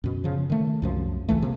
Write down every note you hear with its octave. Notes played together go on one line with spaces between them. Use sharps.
F#2 B2
C#3 F3
D#3 A3
C2 F#2 F3
G#1 C#2 E3 A3
C3 A#3